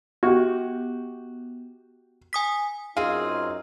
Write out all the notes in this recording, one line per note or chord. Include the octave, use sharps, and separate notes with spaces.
B3 F#4 G4
G#5 D#6 B6
F#2 C4 D#4 F4 G#4 F5